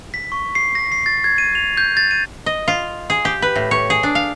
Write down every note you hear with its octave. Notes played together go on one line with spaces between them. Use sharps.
B6
C#6
C7
A#6
C7
A6
G#6
D#7
F7
G6
A6
D#7
D#5
F4
G#4
G4
B4
A2
C#5
G#4
D4
F5